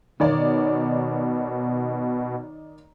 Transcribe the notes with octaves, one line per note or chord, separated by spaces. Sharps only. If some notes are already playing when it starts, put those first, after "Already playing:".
B2 D#3 C#5 D5